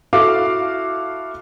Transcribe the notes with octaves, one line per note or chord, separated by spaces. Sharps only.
E4 F#4 A4 F5 D6